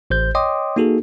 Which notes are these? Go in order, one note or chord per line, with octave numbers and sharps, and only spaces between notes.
A1 C5 G6
C#5 D#5 G5 C6 D6 D#6
A#3 D#4 F#4 G#4 A4